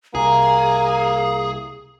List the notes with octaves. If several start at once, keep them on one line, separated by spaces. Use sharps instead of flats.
C2 A#3 G#4 A#5